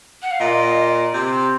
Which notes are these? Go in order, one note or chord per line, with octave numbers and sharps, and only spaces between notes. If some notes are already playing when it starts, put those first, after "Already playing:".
F#5
F5
A#2 D#5
C3